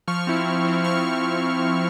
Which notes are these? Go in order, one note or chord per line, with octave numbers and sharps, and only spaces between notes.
F3 C#6 F6
C4 E4
F3
C4 E4
F3 C#6 F6